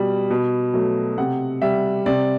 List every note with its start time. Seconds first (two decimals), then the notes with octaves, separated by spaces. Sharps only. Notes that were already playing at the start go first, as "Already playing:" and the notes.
Already playing: B2 G3
0.31 B2
0.74 F#3 A3
1.18 C3 F#5
1.62 G3 E5
2.06 C3 D5